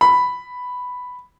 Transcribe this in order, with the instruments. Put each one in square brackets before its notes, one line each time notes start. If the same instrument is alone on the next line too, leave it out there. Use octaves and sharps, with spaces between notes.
[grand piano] B5